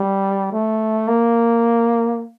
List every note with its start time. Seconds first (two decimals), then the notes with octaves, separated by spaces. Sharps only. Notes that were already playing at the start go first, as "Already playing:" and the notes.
Already playing: G3
0.53 A3
1.08 A#3